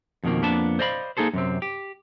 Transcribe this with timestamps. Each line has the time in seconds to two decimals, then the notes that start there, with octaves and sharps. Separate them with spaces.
0.24 F2 B2 D#3 A#3
0.42 F2 A#3 B3 D4 A5
0.79 C5 D5 D#5 F5 A#5 B5
1.17 A#3 D#4 G#4 A4 C5
1.33 F#2 C3 C4
1.62 G4